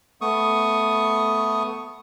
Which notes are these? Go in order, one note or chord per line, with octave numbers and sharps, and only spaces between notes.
A3 B3 C#6 D#6